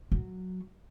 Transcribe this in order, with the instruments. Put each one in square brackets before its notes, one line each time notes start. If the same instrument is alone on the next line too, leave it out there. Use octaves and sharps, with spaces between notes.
[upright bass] F#3